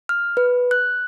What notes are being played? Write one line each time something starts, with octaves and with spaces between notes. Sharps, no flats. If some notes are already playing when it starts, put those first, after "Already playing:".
F6
B4
F#6